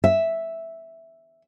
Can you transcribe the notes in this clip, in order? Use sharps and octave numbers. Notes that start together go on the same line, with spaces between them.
E5